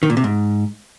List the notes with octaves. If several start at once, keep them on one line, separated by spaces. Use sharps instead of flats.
D#3
A#2
C3
G#2